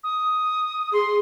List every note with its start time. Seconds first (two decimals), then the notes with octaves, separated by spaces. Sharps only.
0.04 D#6
0.93 G#4 C6